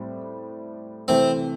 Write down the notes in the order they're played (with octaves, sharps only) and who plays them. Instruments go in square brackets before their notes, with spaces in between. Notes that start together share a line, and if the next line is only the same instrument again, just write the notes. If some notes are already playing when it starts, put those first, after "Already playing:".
Already playing: [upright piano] A2 G3 C4
[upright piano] C3 E3 A3 [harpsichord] C4 C5